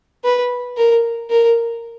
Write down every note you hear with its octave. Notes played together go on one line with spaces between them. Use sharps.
B4
A#4
A#4